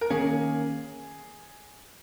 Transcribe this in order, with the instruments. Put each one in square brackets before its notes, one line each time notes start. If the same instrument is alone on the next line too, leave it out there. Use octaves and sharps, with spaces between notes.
[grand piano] A#4
[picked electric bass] D#3 A#3 C#4 [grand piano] G#4